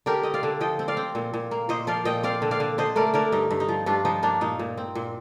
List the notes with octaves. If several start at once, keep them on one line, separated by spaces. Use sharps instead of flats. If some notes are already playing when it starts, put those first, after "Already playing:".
D3 G4 A#4
C4 D#5
D5 F5
D3
F3 D#5 G5
C4
D5 F5
C4
A#2
A#2
A#3
A#2 C5 D#5
F3 D5 F5
A#2 D#5 G5
C4 D5 F5
D3
D5 F5
D3
D3 C5 D#5
A3 A#4 D5
D3 A#4 D5
G2 D#4
G2
D#4
F3
G2 D4 F4
F3 D#4
A#3 D4
A#2 D#4
A#2
C4
A#2